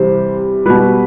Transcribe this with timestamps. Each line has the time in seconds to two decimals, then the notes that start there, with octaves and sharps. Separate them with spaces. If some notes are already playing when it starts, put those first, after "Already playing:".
Already playing: C3 E3 G3 C5
0.66 B2 G3 B4